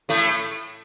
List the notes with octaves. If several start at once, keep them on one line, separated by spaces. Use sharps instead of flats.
A2 A3